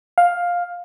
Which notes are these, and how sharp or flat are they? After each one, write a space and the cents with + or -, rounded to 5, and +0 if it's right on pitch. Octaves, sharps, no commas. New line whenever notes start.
F5 +10